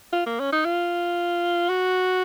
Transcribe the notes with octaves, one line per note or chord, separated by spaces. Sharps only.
F4
A#3
C#4
D#4
F4
F#4